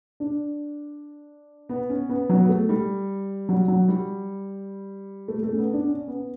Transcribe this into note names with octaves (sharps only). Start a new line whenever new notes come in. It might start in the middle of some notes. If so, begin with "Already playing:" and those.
D4
B3
C#4
B3
F#3
B3
A3
G3
F#3
F#3
G3
A3
A3
C#4
B3
D4
C#4
B3